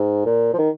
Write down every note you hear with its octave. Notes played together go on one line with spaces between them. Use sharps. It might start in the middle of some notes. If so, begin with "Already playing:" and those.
Already playing: G#2
A#2
F3
D#3